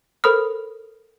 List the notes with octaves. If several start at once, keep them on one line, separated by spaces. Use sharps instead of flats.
A4 A#4 C5 B5 D#6 F6